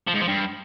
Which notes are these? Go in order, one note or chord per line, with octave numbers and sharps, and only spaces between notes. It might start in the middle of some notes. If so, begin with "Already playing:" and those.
F3
G#2
F3
G2